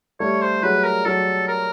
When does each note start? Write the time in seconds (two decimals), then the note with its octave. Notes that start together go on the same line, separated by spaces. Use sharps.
0.20 G3 A3 C#5
0.42 C5
0.63 F#3 G#3 B4
0.84 A#4
1.05 F#3 A4
1.48 A#4